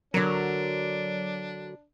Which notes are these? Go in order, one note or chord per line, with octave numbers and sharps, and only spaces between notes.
D3 F#3 D4 A#4